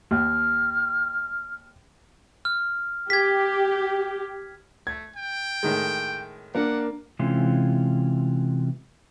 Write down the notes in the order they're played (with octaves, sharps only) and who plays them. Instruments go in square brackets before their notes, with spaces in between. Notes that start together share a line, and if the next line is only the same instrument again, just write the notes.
[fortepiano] D#2 [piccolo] F6
[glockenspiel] F6
[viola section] G4 [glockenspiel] G#6 B6
[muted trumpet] A3 [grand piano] G#6
[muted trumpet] G5
[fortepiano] A2 D#3 G#3
[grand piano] A#3 D4 [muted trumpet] F#5
[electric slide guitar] C3 E3 G#3 C#4 F4